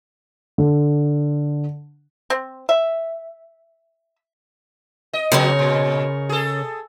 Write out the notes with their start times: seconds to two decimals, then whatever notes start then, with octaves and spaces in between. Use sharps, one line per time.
0.58 D3
2.30 C4
2.69 E5
5.13 D#5
5.32 C#3 F3 B3 A#4 C#5
5.59 A#2
6.29 G#4 A4